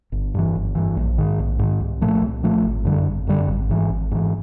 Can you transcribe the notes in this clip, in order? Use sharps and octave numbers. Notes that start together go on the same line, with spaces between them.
G1
G2 E3
G1
G2 E3
A#1
G#2 D#3
A#1
G#2 D#3
C2
A#2 F3 A3
C2
A#2 F3 A3
G#1
F#2 D3 G3
G#1
F#2 D3 G3
G#1
G#2 E3
G#1
G#2 E3